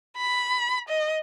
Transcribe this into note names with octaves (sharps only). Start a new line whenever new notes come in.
B5
D#5